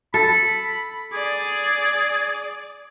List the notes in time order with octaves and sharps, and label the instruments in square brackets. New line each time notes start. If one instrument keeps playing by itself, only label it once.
[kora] A4 [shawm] B5
[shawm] G#4 [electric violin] D5